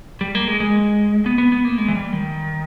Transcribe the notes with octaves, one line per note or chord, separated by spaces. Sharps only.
G3
A#3
G#3
G#3
B3
B3
B3
A#3
G#3
E3
G3
D#3